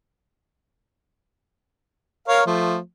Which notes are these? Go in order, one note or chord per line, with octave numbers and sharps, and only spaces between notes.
A#4 C#5 F5
F3 A3